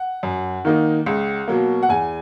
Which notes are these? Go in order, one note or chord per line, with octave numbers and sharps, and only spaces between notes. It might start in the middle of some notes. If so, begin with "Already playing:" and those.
Already playing: F#5
F#2
D#3 A#3 D#4
C#2
B2 F#3 A#3
F#5
E2 G#5